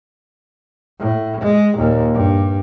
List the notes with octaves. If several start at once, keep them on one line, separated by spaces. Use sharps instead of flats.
A2
G#3
D#2 A#2
G2